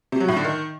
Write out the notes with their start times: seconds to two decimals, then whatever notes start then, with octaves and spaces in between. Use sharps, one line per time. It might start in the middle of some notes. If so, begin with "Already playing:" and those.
0.12 C3
0.20 F#3
0.28 A2
0.36 D3
0.45 D#3